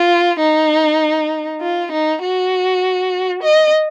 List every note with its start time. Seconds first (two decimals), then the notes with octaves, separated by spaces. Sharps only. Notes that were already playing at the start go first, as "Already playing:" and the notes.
Already playing: F4
0.40 D#4
1.61 F4
1.92 D#4
2.22 F#4
3.43 D#5